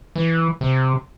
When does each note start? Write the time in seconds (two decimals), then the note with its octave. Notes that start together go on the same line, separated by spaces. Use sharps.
0.16 E3
0.61 C3